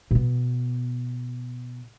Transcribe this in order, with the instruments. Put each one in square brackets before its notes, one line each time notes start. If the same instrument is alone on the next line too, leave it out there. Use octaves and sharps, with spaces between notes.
[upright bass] B2 B3